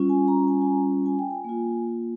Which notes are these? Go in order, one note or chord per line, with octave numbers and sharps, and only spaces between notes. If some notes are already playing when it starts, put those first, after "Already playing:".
Already playing: G3 C#4 F4
G#5
A#5
G#5
G#5
A#5
G#5
G5
G#5
A#3 F4